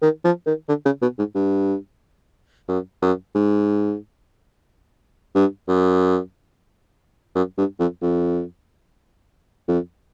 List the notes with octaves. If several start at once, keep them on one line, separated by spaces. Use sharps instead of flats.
D#3
F3
D#3
D3
C#3
B2
G#2
G2
F#2
F#2
G#2
G2
F#2
F#2
G2
F2
F2
F2